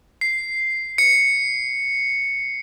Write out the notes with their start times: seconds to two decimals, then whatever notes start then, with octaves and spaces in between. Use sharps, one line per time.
0.21 C7
0.98 C#7